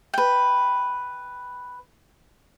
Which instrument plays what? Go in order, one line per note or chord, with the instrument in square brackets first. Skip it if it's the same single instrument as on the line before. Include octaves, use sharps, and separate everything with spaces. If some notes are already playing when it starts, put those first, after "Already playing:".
[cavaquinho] B4 G5